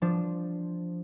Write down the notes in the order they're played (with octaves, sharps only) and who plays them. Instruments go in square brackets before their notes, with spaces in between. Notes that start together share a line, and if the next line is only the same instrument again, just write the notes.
[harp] F3 D4